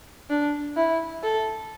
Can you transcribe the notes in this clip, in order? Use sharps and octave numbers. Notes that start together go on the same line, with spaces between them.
D4
E4
A4